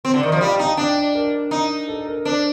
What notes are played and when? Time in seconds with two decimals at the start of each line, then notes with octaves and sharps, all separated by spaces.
0.05 C4
0.14 D3 D5
0.23 D#3
0.29 F3 D#5
0.41 G3 F5
0.54 G5
0.59 D#4
0.65 A5
0.77 D4 G5
0.97 D5
1.15 A#4
1.51 D#4
1.88 A4
2.07 A#4
2.25 D4 C5